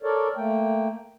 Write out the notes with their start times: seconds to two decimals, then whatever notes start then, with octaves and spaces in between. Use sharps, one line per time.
0.03 A4 A#4 C#5 D5
0.36 A3 A#3 G5